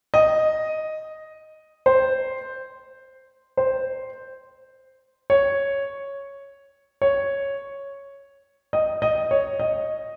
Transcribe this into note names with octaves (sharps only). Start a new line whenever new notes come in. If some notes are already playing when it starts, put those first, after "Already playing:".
D#5
C5
C5
C#5
C#5
D#5
D#5
C#5
D#5